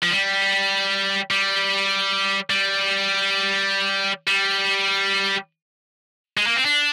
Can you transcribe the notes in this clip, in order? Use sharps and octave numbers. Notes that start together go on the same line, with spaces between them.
F3
G3
G3
G3
G3
G#3
A#3
C4
D4